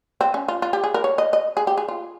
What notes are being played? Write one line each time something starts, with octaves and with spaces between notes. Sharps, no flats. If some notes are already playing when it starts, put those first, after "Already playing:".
C4
C#4
F4
F4
G4
G#4
A#4
C#5
D#5
D#5
G#4
G4
G#4
F4